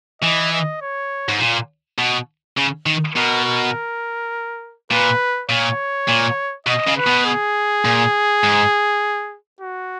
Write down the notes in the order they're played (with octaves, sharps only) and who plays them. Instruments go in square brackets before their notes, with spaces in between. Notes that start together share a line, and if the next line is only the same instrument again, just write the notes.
[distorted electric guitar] E3 [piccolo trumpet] D#5
[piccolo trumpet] D#5
C#5
[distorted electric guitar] G#2
A#2
B2
C#3
D#3
[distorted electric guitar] B2 [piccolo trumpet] A#4
[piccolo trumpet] A#4
[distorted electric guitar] A#2 [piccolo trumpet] B4
[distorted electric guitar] A#2 [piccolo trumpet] C#5
[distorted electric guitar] A#2
[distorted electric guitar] B2 [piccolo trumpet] D#5
[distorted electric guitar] C#3
[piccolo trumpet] B4
[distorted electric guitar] B2
[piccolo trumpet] G#4
[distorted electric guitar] A#2
G#2
[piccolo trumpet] F#4